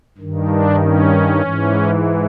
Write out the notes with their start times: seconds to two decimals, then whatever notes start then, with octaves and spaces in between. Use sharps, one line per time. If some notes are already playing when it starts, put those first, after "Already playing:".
0.18 G2 D#3
0.48 D4
0.79 C#4
1.41 G#2 E3